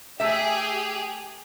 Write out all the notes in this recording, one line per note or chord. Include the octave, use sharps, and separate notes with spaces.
A3 G4 G#4 E5